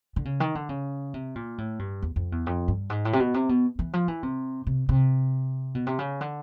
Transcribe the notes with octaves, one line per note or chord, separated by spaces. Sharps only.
D3
C#3
D#3
D3
C#3
C3
A#2
A2
G2
E2
F2
E2
F2
G2
G#2
A2
C3
B2
C3
B2
E3
F3
E3
C3
C3
C3
B2
C3
C#3
D3